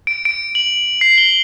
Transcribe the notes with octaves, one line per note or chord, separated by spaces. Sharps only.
D7
D7
F#7
C7
G7